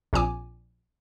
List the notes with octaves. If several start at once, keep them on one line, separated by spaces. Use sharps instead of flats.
A#1 A#2 C4 G#5 D6